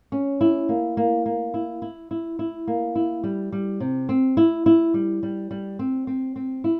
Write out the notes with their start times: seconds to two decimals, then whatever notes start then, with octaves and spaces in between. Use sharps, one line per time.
0.12 C#4
0.41 E4
0.69 A#3
0.97 A#3
1.26 A#3
1.54 E4
1.82 E4
2.11 E4
2.39 E4
2.67 A#3
2.95 E4
3.24 G3
3.52 G3
3.80 C3
4.09 C4
4.37 E4
4.66 E4
4.94 G3
5.23 G3
5.51 G3
5.79 C4
6.07 C4
6.36 C4
6.64 E4